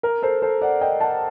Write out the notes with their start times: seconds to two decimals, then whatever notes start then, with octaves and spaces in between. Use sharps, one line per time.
0.03 A#4
0.22 A4 C5
0.42 A4 C5
0.61 D5 F#5
0.81 D#5 G5
1.00 F#5 A5